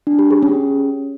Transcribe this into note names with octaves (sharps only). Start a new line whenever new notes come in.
D4
G4
G#4
C#4